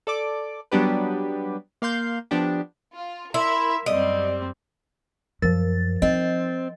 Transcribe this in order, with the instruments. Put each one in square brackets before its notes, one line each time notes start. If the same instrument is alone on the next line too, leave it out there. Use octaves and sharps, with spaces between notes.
[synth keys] A4 D5 D6
F#3 G3 B3 D4 G4 B4
A#3 F5 C6 G6
F3 B3 D4 G4
[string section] F4
[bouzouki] E4 [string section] A#4 E5 [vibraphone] C6
[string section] F#2 G3 C4 [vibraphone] D5 [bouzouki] D#5
[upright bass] F#2 [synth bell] F3 A6 [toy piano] A#4
[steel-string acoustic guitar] C4 [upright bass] D#4 [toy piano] D#5